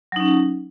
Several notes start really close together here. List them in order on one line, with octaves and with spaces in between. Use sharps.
F#3 D#4 C#4